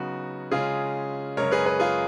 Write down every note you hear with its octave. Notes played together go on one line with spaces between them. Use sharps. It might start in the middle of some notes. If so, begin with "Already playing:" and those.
Already playing: C#3 F#3 B3 D#4 F#4
C#3 G#3 C#4 F4 G#4
F#2 C#3 G#3 A#4 C#5
G#4 B4
G#4 B4
F4 G#4